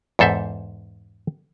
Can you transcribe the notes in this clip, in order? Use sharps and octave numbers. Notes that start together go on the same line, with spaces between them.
E2 G#2 A4 C5 E5